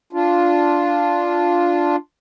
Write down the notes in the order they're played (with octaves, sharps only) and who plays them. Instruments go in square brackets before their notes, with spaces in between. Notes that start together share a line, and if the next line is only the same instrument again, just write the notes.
[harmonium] D4 F4